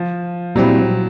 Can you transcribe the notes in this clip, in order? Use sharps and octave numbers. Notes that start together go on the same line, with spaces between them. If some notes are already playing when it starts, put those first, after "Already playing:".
Already playing: F3
A#2 F#3 G3 C4 E4